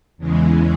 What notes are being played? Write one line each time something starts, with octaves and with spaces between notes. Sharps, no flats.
E2 C#3 E3 G#3